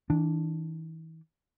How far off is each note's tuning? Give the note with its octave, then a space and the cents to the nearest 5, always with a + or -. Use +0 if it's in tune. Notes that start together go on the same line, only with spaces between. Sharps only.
E3 -40 D4 +0